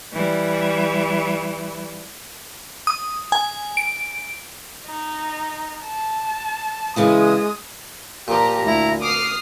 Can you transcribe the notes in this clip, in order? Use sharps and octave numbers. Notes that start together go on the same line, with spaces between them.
E3 G3
D#6
G#5
D7
D#4
A5
C#3 E3 G#3 E4 D#6
A#2 F3 G4 A#5
D2 E4 A#5
D6 D#6 F6 C7